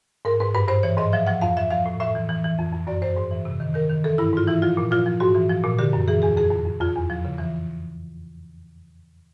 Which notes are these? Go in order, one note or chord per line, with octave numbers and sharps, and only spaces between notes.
G#2 A#4
G#2 B4
G2 B4
G2 C5
E3 C#5
G#2 D#5
F3 E5
F3 F#5
F2 F5
F3 E5
F3 F5
A2
A2 E5
E3
E3
E3
F2
F2
F#2 D5
F#2 C5
G#2
E3
C3
D#3
D#3 A#4
D#3
E3 A4
G2 E4
G#2 F4
E3 E4
F3 F4
A#2
F3 F4
F3
G#2 F#4
E3
F3
A#2
D3 G4
F#2
E3 G#4
E2 G#4
F2 G#4
F2
F2
F2 F4
E2
F3
C#3
E3